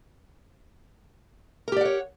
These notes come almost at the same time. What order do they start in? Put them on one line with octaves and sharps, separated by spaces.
A#4 G4 D5 F#5 C#5